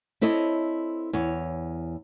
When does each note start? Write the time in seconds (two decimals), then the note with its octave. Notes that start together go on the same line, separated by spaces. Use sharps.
0.21 C4 E4 A4 C#5 D#5
1.13 E2 C#5